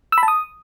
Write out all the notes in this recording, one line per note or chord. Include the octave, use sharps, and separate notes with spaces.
E6
B5
A5
D#6